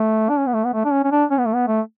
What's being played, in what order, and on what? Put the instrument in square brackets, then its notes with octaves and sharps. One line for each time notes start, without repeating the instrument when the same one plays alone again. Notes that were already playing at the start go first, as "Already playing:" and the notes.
Already playing: [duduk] A3
D4
C#4
B3
A3
B3
A3
D4
C#4
C#4
D4
C#4
B3
A3
B3
A3